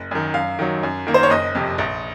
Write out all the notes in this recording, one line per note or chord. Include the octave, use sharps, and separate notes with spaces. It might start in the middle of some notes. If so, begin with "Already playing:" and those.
Already playing: F#1
F#2 D#3
F#2 F5
D#3 F#3
F#2
D#3 A#3
C5
C#5
F#1 D#5
F2 C3
A#1